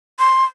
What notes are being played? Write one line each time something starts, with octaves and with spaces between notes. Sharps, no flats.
C6